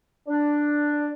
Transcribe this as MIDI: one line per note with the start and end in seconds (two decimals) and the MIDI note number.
0.27 1.13 62